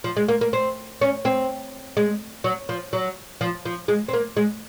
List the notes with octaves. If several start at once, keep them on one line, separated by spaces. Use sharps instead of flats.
F3
G#3
A#3
A#3
C4
C#4
C4
G#3
F#3
F3
F#3
F3
F3
G#3
C4
A#3
G#3